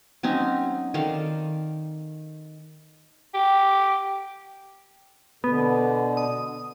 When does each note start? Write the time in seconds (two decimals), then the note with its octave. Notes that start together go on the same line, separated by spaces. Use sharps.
0.23 F#3 C4 C#4 D#4
0.94 D#3 A4 D5 F5
3.34 G4
5.44 B2 D3 B3
6.17 D#6